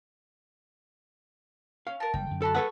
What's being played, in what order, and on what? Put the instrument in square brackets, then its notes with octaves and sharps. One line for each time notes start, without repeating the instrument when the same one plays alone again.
[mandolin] C#4 [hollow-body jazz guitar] F5
[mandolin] A#4 A5
[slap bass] F#1 A#2 G3 [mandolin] G5
[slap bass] F#2 D3
[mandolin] F#4 A5 B5 [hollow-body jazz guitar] A4
[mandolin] G#4 C#6 E6 [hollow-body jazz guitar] A4 B4 F#5